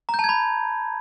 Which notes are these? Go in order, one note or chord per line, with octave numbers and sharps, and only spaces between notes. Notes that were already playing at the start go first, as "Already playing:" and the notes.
A#5
G6
A5
G#6
B5